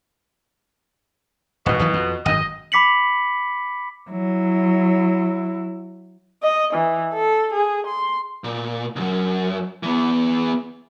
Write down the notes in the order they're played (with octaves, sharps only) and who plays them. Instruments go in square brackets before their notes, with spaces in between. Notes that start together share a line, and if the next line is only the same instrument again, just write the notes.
[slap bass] D#1 G#2 [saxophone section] B2
[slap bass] G#1 E3 F#3
F2
[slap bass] G#1 F#2 [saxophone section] D#5
[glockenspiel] B5 D6 B6 C#7 F#7
[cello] F#3 E4
[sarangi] D#5
E3
A4
G#4
C6
[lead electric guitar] A#2
C2 F#2
E3 B3